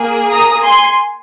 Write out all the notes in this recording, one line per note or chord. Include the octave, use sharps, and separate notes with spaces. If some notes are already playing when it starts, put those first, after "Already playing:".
Already playing: A#3 G#4
A#5 D#6
G#5 C6